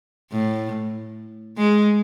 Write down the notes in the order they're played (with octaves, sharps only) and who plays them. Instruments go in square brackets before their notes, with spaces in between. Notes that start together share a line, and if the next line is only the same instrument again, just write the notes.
[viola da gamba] A2
G#3